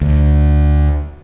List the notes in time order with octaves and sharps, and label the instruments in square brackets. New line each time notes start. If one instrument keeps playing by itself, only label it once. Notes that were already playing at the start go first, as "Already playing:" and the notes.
[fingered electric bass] D2